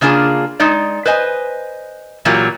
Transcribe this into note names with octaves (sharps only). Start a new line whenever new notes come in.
C#3 A#3 D4 F4 G#4
G#3 D#4 D5
B4 C5 D#5 G#5
A#2 E3 F#3 A#3 F4 G4